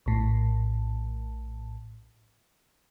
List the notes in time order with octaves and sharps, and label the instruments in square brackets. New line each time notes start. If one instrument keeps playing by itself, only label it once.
[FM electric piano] A#1 A2